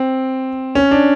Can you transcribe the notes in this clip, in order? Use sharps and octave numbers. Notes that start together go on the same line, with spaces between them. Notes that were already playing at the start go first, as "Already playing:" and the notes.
Already playing: C4
C#4
D4